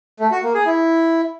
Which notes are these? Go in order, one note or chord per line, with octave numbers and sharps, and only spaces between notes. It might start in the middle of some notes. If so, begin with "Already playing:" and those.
A3
F#4
A#3
G#4
E4